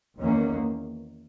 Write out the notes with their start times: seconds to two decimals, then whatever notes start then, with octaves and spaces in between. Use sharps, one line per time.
0.17 E2 D#3 A#3 C#4